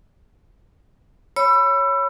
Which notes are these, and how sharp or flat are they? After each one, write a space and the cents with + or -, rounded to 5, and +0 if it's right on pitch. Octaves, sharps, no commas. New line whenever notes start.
C#5 +0 B5 +0 E6 +30